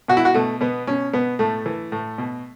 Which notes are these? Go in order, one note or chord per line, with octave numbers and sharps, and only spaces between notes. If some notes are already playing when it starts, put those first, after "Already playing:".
B2 F#4
E4
F#4
B2 A3
B2 B3
B2 C#4
B2 B3
A2 A3
E3
A2
B2